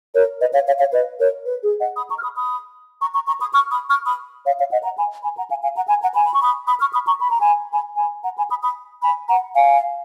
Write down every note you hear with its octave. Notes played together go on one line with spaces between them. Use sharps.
A#4 C#5
B4 D#5
C#5 F5
C#5 F5
C#5 F5
B4 D#5
A#4 C#5
B4
G#4
D#5 F#5
B5 D#6
A#5 C#6
F6
B5 D#6
B5 D#6
A#5 C#6
A#5 C#6
A#5 C#6
B5 D#6
C#6 F6
B5 D#6
C#6 F6
B5 D#6
C#5 F5
C#5 F5
D#5 F#5
F#5 A#5
G#5 B5
G#5 B5
F#5 A#5
F5 G#5
F5 G#5
F#5 A#5
G#5 B5
F#5 A#5
G#5 B5
B5
C#6
B5 D#6
B5 D#6
C#6 F6
B5 D#6
A#5 C#6
B5
A#5
G#5 B5
G#5 B5
G#5 B5
F#5 A#5
G#5 B5
B5 D#6
B5 D#6
G#5 B5
F#5 A#5
F5 G#5